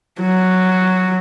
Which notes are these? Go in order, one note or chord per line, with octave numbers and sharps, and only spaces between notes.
F#3